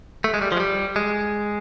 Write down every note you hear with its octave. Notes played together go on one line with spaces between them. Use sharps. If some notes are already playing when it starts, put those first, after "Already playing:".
A3
G#3
G3
F3
G#3
G3
G#3